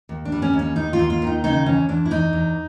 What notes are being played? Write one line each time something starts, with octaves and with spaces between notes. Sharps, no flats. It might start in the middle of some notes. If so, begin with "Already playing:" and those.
D#2
D4
G3
C#4
D#2
C#4
D#2 D#4
F4
D#2
F4
D#3 D#4
C#3 D#4
E2 C#4
E2 D4
E4
E2 D#4
E2